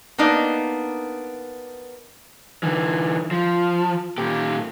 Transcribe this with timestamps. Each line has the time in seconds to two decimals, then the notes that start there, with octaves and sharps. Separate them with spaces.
0.18 A#3 B3 D4 D#4
2.63 D3 E3
3.31 F3
4.18 A#2 G4